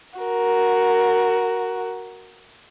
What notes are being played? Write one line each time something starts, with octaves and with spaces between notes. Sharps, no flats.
F#4 A#4